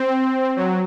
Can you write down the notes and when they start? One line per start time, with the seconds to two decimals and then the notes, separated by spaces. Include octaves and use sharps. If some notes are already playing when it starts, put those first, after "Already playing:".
Already playing: C4
0.56 F#3